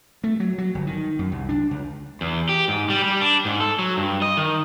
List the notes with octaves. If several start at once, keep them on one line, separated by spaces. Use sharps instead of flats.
A3
F#3
F#3
G1
D#3
F#2
C2
D4
C#2
E2
G4
G#2
G3
G3
D4
G#2
A4
F#3
G2
D#5
D#3